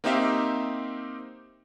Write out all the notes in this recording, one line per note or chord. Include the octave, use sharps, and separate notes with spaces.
A#3 C4 D#4 G4 E5 F5